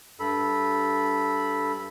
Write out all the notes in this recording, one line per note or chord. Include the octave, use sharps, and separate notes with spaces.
G2 A4 B5